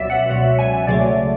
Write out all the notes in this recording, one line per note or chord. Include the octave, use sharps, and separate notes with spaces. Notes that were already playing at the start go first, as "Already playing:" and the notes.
Already playing: C#2 B2 F#3 D5 E5
F#5
C#2 B2 F#3 F#5
G#5
C#2 C#3 F#3 A3 D5